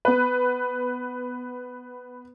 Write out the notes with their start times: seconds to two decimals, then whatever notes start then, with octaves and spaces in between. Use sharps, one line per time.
0.05 B3 B4